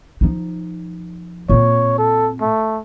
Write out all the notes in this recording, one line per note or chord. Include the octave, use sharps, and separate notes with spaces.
F3 D#4
A#2 C4 C#5
A4
A3